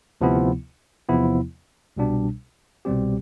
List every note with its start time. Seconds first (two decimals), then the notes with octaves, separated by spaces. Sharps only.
0.21 D2 C3 F3 B3 E4
1.09 E2 C3 F3 B3 E4
1.97 C2 B2 G3 D4
2.85 C2 B2 G3 C4 G4